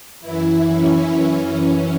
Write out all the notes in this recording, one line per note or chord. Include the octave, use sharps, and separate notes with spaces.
F#2 E3 E4
C#4
F#2 E3 C#4